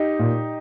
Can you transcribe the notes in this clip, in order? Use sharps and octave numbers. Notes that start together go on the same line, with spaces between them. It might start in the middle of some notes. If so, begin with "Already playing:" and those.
Already playing: D#4 G4
A#2